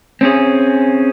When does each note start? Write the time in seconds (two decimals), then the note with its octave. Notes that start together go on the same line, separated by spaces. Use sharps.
0.21 C4 C#4 G#4